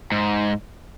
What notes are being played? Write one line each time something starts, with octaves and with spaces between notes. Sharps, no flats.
G#2